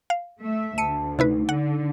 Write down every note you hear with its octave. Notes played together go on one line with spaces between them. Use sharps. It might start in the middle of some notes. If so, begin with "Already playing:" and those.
F5
A3 E5
D2 A5 C#7 D#7
C3 D#4 E4 B4
D3 F#5